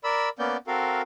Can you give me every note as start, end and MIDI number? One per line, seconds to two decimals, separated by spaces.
0.04 0.29 70
0.04 0.29 74
0.04 0.29 83
0.04 0.29 88
0.39 0.57 58
0.39 0.57 59
0.39 0.57 61
0.39 0.57 74
0.39 0.57 91
0.67 1.02 60
0.67 1.02 66
0.67 1.02 69
0.67 1.02 70
0.67 1.02 77